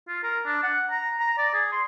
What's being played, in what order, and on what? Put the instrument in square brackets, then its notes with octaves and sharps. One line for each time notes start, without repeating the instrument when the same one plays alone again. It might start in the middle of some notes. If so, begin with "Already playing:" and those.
[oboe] F4
A#4
D4
F#5
A#5
A#5
D5
G#4
C6